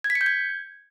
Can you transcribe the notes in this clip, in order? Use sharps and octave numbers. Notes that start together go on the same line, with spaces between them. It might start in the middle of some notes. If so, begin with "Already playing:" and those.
G#6
B6
C#7
G6
G#6